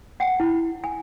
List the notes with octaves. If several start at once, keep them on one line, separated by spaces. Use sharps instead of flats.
F#5 G5
E4
G#5